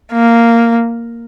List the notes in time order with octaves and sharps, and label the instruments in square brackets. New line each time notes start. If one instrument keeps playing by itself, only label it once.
[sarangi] A#3